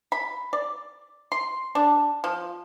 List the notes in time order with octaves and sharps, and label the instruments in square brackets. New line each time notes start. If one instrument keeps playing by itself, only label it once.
[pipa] B5
D5
C6
D4
F3